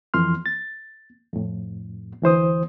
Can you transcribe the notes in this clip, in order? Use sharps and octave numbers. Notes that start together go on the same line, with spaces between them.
F2 E3 C6 F6
A6
F2 A2
D2 E3 C5 D#6